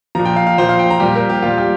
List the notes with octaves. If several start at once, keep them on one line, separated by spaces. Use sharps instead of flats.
A#2 F3 A#5
G5
F5
F5
A#2 F3 C5
F5
G5
A#5
A#2 G3 G4
A#4
G4
A#2 G3 F4
G4